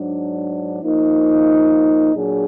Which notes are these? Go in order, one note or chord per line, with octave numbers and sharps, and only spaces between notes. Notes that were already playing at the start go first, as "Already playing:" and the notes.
Already playing: G#2 F#3 D4
F3 A#3 D#4
A#2 F#3 D4 G#4